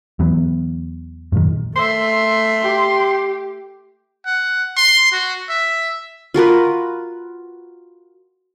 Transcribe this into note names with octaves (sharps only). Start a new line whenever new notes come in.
E2 E3 F#3 B3
F#2 A#2 D#3
A3 E5 C6
G4
F#5
C6
F#4
E5
F4 F#4 A#4 B4